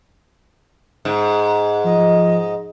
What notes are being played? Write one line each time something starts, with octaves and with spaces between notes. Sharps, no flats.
G#2
F3 D#5